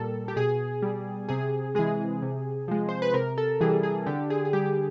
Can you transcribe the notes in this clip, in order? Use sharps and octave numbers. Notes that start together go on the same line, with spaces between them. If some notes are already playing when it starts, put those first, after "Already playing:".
Already playing: A#2 G3 A4 A#4
G4
B2 G#4
G3
C3 G#4
E3 G#3 G#4
C3
F3 G#3
C5
B4
C3 A#4
A4
E3 G3 G#4
G#4
D3 G4
G#4
G#4
G3 G4